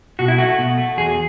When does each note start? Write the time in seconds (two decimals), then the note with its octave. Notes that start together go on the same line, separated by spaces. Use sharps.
0.19 B2 F#4
0.28 E4
0.38 A3 F#4
0.58 B2
0.78 A3
0.97 E2 G#4